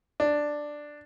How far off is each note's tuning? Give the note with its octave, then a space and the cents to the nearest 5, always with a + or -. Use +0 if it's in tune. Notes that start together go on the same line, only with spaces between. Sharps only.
D4 +5